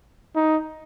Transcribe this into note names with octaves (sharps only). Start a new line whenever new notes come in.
D#4